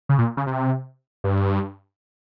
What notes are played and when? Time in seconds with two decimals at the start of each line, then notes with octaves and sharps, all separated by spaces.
0.09 C#3
0.19 A#2
0.37 C#3
0.47 C3
1.24 G2